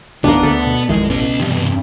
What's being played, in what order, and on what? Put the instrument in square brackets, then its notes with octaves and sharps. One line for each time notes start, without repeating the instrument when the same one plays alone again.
[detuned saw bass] G1 [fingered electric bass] D#2 A2 D#3 [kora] A#3 D4 [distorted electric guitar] B3
[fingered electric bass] D2 [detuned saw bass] D3 [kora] A4
[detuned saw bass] B2
[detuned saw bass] A1 [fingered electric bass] F2 D#3 E3 [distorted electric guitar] G#3
[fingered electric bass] B2 [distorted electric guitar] C#4 D#5
[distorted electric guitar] E2 C3 [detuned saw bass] G2